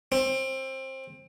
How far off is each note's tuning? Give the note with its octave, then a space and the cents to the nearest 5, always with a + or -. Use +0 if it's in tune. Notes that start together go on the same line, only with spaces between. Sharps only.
C4 +20